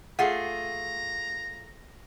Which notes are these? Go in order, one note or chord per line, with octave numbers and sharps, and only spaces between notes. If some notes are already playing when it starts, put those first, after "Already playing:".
A3 F4 G#4 F#5 A#5